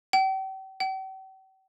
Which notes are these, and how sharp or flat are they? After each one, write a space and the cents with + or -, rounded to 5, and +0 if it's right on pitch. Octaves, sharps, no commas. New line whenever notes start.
G5 -40
G5 -45